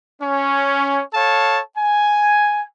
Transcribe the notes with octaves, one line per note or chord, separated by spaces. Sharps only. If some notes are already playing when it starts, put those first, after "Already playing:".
C#4
A4 C#5 F5 A5
G#5